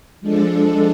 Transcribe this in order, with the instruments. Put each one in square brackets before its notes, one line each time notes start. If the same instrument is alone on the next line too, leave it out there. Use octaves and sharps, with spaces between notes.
[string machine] F3 G#3 D4 A4